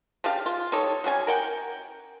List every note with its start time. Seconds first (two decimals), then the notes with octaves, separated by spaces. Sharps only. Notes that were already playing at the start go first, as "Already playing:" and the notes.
0.24 C#3 D4 G4 F5
0.46 F4
0.72 G3 D#4 A4 C#5
1.04 F#3 G3 C#4 G#5
1.27 A#4 F#5 G5